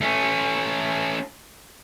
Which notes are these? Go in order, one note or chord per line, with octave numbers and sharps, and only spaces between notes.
A3 C#4